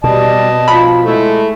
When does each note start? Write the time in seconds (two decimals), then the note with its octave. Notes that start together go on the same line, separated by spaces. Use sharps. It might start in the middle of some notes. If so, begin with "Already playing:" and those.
0.04 B2 G3 D#5 A5
0.68 F3 B5
1.05 G#3 A3 E4